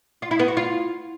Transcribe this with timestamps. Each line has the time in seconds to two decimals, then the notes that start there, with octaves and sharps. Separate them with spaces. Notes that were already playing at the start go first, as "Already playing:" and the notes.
0.22 F4
0.31 E4
0.39 B3
0.48 F#4
0.57 F4